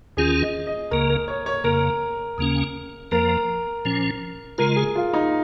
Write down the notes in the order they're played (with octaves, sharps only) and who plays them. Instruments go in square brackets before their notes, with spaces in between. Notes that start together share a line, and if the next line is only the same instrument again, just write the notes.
[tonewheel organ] D#2 D#3 C#4 F4 [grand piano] G#4
[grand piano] D#5
D#5
[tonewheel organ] C#2 C#3 A#3 [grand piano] A#4
[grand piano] A#4
C#5
C#5
[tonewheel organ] F2 C#3 A#3 [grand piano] A#4
[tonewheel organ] D#2 C#3 A#3 C#4
[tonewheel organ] F2 F3 A#3 [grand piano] A#4
[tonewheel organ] A#2 F3 C#4
[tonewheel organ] C#3 G#3 F4 [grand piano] A#4
[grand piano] G#4
F4
D#4